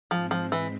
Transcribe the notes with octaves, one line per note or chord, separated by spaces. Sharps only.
G#2 F3 G#3 C4
F3
E3